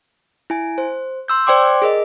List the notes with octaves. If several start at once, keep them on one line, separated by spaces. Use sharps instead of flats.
E4 G#5
C5
C6 E6 G6
C5 D5 G5 C6 D6
G#4 A#4 D#5